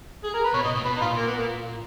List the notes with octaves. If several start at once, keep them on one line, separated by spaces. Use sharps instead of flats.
G#4
A#4
B4
B2 C#5
B2 D#5
A#2
B2 B4
D#4
A#2 F4
A#3
B3
A#3